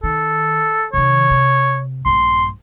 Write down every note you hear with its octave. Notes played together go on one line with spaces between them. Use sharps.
D#3 A4
C3 D#3 C#5
C3
A#1 G2 C6